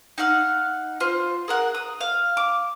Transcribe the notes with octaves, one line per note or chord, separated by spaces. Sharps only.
D#4 F5 F#5 F6
F4 C5
G#4 A#4 F#5
D#6
F5
D6